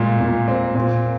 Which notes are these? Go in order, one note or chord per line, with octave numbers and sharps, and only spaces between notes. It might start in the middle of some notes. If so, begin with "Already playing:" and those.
Already playing: A#2 G#3
A#2
C4
A#2